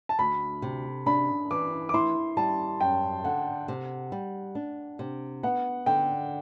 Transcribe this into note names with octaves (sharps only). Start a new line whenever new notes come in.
A5
D2 B5
C3
D4 B5
E3 D6
D6
E4 C6
G3 A5
F#2 G5
D3 F#5
C3
G3
D4
C3
B3 F#5
D3 G5